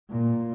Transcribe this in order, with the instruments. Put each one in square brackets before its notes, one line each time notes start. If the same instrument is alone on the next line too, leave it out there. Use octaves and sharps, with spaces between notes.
[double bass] A#2